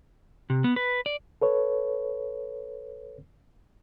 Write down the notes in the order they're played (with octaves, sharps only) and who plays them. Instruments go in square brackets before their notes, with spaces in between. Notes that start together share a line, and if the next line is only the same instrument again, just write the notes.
[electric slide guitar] C3
B3
B4
D5
[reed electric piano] A4 B4 C#5